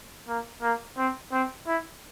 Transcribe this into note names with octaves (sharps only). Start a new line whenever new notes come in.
A#3
A#3
C4
C4
E4